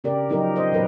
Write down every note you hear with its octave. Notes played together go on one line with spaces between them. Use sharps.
C#3 G4 A#4 D5
F3 F#3 D#4 G4 A#4
C5 D#5
A#2 F#3 A#4 B4